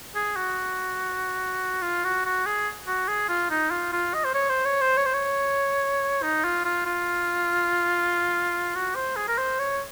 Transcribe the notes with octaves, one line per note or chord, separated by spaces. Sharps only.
G#4
F#4
F4
F#4
F#4
G#4
F#4
G#4
F4
D#4
F4
F4
D#5
C5
C#5
C5
C#5
C5
C#5
C5
C#5
D#4
F4
F4
F4
F#4
C5
G#4
A#4
C5
C#5